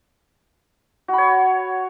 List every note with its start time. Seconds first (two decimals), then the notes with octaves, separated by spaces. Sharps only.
1.08 F#4
1.13 B5
1.18 C#5